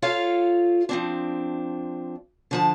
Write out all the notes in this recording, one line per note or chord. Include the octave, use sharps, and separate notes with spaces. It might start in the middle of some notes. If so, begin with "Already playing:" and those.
F4 A4 C#5 F5
F3 C4 D4
D3 F3 A5